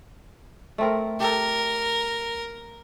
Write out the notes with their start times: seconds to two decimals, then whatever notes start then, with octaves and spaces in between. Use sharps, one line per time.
0.78 A3 C4 A#4
1.20 G4 A4 A#4